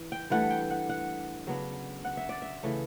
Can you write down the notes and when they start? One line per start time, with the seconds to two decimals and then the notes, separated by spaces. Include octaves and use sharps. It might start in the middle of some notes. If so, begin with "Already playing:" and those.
Already playing: E3
0.12 G5
0.30 G2 E3 A3 F#5
0.50 G5
0.70 F#5
0.89 F#5
1.47 C#3 F#3 B3 D4
2.05 F#5
2.17 E5
2.29 D5
2.42 E5
2.63 C#3 E3 A3 C#4